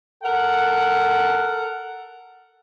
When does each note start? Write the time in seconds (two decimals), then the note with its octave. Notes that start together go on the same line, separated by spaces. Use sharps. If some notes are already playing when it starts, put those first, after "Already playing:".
0.23 A4 A#4 F#5